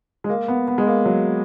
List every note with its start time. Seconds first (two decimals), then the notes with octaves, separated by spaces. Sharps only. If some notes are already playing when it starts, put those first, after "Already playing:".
0.24 G#3
0.29 A#3
0.48 B3
0.68 B3
0.78 G#3
0.87 A#3
1.05 F#3